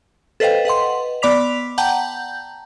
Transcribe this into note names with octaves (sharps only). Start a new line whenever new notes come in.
A4 B4 C5 D#5 F5 G5
B4 D#5 F#5 C6
B3 D5 B5 D6 B6 F7
F#5 G5 A5 A#5 G6